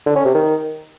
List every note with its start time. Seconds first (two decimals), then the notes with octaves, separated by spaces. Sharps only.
0.06 D3
0.16 C#4
0.25 C3
0.35 D#3